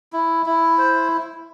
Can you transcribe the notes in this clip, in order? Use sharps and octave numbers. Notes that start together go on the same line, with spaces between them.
E4
E4
C5